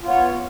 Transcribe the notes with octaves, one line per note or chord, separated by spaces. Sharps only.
B3 F4 C#5